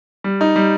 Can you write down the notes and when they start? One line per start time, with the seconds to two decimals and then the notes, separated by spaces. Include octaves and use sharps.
0.24 G3
0.41 D#4
0.56 G3